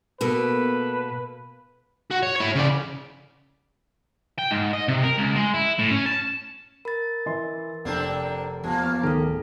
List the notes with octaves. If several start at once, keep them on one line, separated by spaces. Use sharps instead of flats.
B2 A#3 A4 B4
F#4
C#5
E4 C#5
C#3 D5
G5
G#2
D#5
C3
A#4
C#2
G#3
E4
A2
C#4
A5
A#4 B5 A6
E3 D#5 C6
F1 A#3 C4 D4
E2 F3 A#3 G4
B3 F6
D1 D#3 G#4 A4